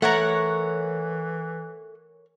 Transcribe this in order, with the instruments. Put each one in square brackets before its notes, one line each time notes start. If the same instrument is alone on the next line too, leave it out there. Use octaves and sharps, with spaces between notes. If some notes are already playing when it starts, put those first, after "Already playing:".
[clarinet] E3 [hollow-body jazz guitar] A3 [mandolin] A#4 C#5 F#5